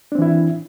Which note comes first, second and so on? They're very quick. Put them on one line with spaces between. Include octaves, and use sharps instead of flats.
D4 C4 E3 E4